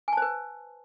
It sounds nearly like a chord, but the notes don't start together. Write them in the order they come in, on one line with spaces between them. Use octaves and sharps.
G#5 A5 C5 B4